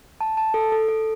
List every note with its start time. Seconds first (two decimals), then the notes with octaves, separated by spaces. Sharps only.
0.21 A5
0.37 A5
0.54 A4
0.72 A4
0.89 A4